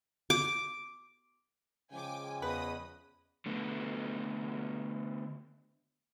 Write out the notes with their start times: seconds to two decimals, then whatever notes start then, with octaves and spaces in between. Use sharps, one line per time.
0.30 D6
1.92 C#3 F3 G#3 G5 G#5 D6
2.42 E2 B4 D#5 B5 D#6
3.46 D3 A3 B3